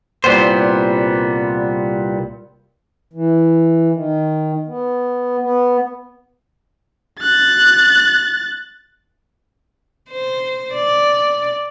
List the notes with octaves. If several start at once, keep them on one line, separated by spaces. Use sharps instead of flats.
C2 A#2 F3 G3 B3 C5
E3
D#3
B3
B3
F#6 A6
C5
D5